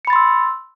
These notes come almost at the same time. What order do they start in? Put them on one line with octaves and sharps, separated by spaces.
C#7 B5 A6 C6 E6